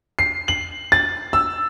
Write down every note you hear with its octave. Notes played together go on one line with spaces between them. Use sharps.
C7
F#7
A6
E6